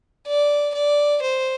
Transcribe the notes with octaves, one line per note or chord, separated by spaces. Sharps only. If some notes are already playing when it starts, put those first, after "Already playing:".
D5
D5
C5